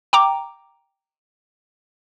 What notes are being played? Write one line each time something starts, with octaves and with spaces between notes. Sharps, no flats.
G5 A#5 D6